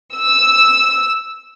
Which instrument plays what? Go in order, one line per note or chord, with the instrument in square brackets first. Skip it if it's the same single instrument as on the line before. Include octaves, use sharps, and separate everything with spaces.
[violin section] E6